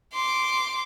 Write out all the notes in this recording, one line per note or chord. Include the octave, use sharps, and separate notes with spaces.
C6 D6